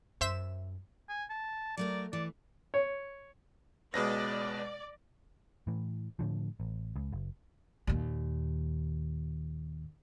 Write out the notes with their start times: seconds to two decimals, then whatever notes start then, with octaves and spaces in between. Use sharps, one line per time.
0.21 F#2 C5 E5 E7
1.09 G#5
1.30 A5
1.77 F#3 A3 A#4 D5
2.13 E3 D5
2.74 C#5
3.94 C#2 B2 G#3 B4 D5 A#6
5.67 A2 E3
6.19 A2 D3 F3
6.60 A1
6.96 C#2
7.12 F#1
7.87 D#2 A#2